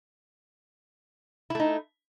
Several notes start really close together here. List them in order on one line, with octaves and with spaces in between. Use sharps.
E4 A3 D#4